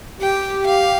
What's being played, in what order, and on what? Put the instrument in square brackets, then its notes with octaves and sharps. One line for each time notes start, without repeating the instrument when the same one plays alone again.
[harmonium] G4 [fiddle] G5
[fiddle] F5